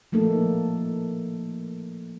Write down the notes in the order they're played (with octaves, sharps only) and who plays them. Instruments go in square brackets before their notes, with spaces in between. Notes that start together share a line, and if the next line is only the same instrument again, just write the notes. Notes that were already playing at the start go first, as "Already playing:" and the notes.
[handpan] F3 A3 A#3 D#4 A4